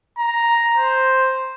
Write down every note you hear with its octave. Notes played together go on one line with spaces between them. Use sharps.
A#5
C5